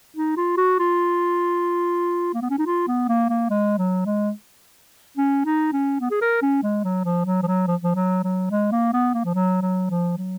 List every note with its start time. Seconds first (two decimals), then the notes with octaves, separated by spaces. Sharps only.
0.16 D#4
0.37 F4
0.57 F#4
0.79 F4
2.34 A#3
2.42 B3
2.50 C#4
2.58 D#4
2.66 F4
2.88 B3
3.09 A#3
3.29 A#3
3.50 G#3
3.78 F#3
4.05 G#3
5.17 C#4
5.45 D#4
5.73 C#4
6.01 B3
6.11 G#4
6.21 A#4
6.42 C#4
6.63 G#3
6.84 F#3
7.05 F3
7.26 F#3
7.43 F3
7.47 F#3
7.67 F3
7.83 F3
7.95 F#3
8.24 F#3
8.51 G#3
8.72 A#3
8.93 B3
9.14 A#3
9.25 F3
9.34 F#3
9.62 F#3
9.90 F3
10.18 F#3